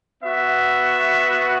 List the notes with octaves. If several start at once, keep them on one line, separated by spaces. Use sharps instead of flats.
B3 F#4 E5